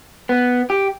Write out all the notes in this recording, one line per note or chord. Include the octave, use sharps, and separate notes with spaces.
B3
G4